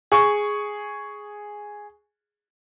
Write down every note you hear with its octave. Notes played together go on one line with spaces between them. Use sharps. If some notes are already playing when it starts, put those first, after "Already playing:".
G#4 C#6